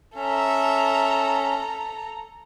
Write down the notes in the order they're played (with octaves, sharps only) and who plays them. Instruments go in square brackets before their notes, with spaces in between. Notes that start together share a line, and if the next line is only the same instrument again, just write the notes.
[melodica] C#4 [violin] A4 A#5 [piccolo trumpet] E5